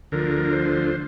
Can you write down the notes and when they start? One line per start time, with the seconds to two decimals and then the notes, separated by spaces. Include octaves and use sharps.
0.12 D2 D3 F3 A#4
0.53 C5